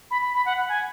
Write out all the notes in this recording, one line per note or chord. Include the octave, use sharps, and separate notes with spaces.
B5
B5
B5
F#5
F#5
G#5